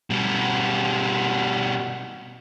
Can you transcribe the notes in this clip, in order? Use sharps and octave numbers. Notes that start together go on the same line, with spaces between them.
B2 G3